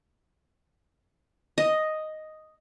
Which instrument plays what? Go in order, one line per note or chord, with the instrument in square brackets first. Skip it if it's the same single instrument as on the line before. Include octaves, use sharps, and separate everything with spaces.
[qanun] D#5